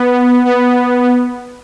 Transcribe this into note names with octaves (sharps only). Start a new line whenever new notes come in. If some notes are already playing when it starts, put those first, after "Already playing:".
Already playing: B3
B3